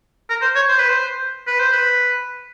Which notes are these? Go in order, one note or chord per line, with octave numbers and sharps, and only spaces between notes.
A#4
C5
C#5
C5
B4
C5
B4
C5
B4